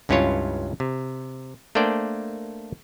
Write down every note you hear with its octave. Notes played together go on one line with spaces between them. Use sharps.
C#2 G2 C#4 E4 F4 C#5
C3
A3 A#3 D4 C5 D5 G5